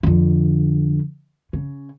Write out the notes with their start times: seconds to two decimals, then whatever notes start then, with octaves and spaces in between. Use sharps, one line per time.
0.03 F2 D3
1.53 C#3